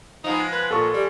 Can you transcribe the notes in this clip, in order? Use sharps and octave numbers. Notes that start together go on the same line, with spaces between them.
F3 G#3 B3 D#4
B4
A#2 A4 C#6
G3